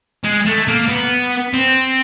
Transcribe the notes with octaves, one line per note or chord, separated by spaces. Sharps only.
G#3
A3
A#3
B3
C4